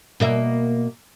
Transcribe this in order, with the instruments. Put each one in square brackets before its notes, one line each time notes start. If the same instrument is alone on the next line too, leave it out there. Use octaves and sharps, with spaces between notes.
[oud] B2 A#3 E5